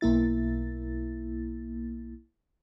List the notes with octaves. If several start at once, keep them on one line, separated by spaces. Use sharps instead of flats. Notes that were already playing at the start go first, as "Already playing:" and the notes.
B1 A#3 E4 A6